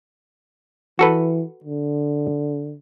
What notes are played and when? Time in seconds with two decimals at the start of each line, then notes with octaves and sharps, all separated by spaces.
0.99 E3 F#4 A4 B4
1.64 D3